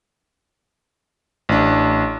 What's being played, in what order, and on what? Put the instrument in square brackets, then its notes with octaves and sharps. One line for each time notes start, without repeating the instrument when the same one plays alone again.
[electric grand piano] A1 D4